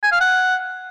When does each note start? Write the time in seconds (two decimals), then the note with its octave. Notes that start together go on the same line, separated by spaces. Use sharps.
0.03 G#5
0.12 F5
0.21 F#5